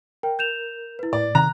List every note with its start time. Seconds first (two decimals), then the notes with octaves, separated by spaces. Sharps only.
0.23 A#4 G5
0.39 G6 E7 F7
0.99 E4 B4
1.13 A2 D5
1.35 C3 D#3 A#5 F#6